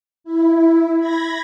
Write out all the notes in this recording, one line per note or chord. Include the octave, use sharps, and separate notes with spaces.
E4
B5 G#6 A#6